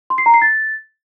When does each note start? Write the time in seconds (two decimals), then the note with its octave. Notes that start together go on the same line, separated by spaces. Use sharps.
0.10 C6
0.18 C7
0.26 A#5
0.34 C7
0.42 A6